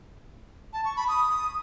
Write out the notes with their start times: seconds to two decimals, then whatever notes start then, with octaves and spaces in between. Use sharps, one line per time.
0.73 A5
0.85 C#6
0.97 B5
1.08 D#6